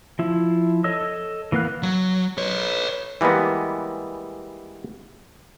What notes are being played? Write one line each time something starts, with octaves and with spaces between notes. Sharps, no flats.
F3 E4
A4 C#5 D#5 E6
E3 A#3 B3 F5 F#6
F#3
B4 C#5
E3 G3 G#3 A#3 B3